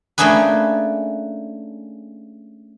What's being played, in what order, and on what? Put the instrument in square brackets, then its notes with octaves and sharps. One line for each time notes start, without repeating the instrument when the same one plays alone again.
[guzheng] A3 A#3 C#4 D4 G#4 B4